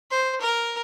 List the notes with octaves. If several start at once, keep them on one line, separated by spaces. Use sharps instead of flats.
C5
A#4